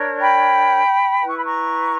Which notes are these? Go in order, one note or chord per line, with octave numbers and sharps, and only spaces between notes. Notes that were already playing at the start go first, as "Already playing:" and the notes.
Already playing: D4 A#4 C#5
G5 B5
E4 B4
C#6
B5
A#5 C#6